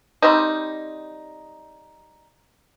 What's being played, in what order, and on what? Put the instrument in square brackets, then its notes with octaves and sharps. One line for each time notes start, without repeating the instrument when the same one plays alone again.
[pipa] G3 C4 D#4